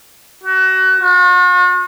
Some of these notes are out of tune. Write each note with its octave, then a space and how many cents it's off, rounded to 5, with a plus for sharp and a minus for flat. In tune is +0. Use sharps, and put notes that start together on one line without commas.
F#4 +25
F#4 -45